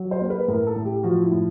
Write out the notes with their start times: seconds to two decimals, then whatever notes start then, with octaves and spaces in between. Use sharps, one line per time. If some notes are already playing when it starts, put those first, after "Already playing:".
Already playing: F#3
0.11 C5
0.21 A#3
0.30 B4
0.48 A2 A#4
0.67 A4
0.76 A2
0.85 G4
1.03 F3 F#4
1.22 E4
1.32 A2